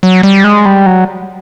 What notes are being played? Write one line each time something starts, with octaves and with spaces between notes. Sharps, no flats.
F#3
G3
G#3
G3
F#3